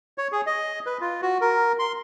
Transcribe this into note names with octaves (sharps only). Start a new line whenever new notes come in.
C#5
G#4
D#5
B4
F4
F#4
A#4
C6